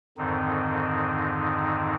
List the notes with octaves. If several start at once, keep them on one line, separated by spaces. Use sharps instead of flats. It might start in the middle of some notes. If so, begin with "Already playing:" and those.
F2 G#2 D3 D#3 C4 D#4